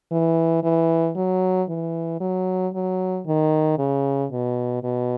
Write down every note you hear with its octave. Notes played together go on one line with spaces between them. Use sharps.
E3
E3
F#3
E3
F#3
F#3
D#3
C#3
B2
B2